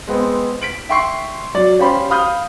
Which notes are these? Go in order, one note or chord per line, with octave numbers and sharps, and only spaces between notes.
G#3 B3 C4
B6 D7 F#7
E5 G5 C6 C#6 C7
F#3 D5
C#4 F4 G4 C5 B5 C6
F5 B5 D#6 F6 G6